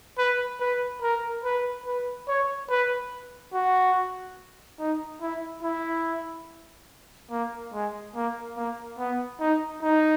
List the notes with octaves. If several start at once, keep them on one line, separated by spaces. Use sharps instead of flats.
B4
B4
A#4
B4
B4
C#5
B4
F#4
D#4
E4
E4
A#3
G#3
A#3
A#3
B3
D#4
D#4